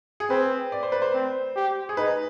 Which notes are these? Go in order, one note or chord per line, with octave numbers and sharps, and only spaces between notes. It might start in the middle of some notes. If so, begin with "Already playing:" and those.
G#4
C4 B4
D5
C5
B4
C5
C4
G4
G#4
D#4 B4